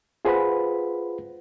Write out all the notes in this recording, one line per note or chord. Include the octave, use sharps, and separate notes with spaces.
F4 G#4 B4 C5 F#5 B5